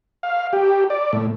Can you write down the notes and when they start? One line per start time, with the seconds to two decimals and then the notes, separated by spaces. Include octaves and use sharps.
0.23 F5
0.53 G4
0.90 D5
1.13 A2